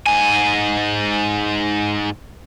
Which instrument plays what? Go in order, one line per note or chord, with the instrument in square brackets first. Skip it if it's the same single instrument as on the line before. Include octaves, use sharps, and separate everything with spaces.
[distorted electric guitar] G#2 G#5